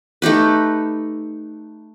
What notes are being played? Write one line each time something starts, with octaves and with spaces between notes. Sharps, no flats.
A3 D#4 G4 B4